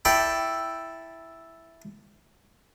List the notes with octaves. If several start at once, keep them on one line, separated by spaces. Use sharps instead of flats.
E4 A4 D5 G5